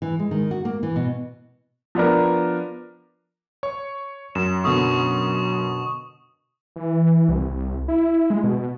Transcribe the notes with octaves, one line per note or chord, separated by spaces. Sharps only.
E3
G#3
D#3
F#4
A#3
E3
B2
F3 B3 D4 A#4
C#5 C#6
F#2 E7
B2 D3 C#6 D#6
E3
C2
E4
G#3
B2